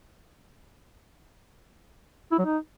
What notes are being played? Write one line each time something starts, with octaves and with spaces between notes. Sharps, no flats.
E4
F#3
D#4